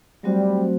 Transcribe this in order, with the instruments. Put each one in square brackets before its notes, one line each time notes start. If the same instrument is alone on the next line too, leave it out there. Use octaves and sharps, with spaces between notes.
[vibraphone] F#3 A3 C4 F#4 C5 [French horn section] G3